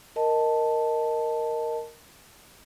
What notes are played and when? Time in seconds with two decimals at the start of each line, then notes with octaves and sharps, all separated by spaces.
0.16 A#4 D#5 A5